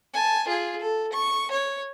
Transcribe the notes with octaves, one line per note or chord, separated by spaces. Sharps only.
G#5 A5
F4 G#4
A4
C#6
C#5